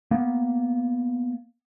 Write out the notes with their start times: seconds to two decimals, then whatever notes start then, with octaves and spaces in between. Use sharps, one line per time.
0.11 A#3 B3